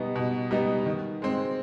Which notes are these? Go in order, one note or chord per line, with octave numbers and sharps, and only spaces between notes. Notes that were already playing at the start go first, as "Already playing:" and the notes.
Already playing: B2 G3 B3 D#4
B2
G3 B3 D#4
D#3
G#3 C4